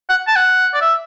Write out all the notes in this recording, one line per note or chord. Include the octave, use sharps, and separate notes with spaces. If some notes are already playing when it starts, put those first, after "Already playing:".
F#5
A5
F#5
D5
E5